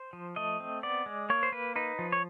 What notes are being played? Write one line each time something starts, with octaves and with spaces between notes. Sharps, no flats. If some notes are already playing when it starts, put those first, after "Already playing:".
Already playing: C5
F3
A3 D#5
C4
B3 D5
G#3
A#3 C#5
C5
A#3 B4
D#4 B4
F3
C#5